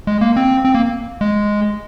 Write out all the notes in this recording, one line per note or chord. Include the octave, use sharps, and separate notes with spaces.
G#3
A#3
C4
C4
A#3
G#3